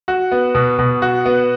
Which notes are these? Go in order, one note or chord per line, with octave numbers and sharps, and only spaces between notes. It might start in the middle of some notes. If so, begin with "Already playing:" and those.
F#4
B3
B2
B2
F#4
B3